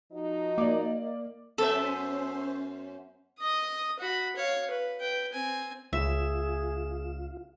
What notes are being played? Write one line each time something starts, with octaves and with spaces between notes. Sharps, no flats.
F3 D#4 F#4 D#5
A#3 D5 D6
F#2 B3 C#4 A4 C5 E5
D#5 D#6
F#4 B5
C#5 F5
B4
B4 G5
C4 G#5
C#2 F4 G#4 E5 E7